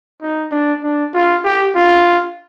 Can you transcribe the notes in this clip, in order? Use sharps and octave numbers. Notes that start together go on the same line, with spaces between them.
D#4
D4
D4
F4
G4
F4